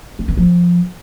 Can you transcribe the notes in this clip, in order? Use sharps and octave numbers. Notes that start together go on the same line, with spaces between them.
C4
D#3
F3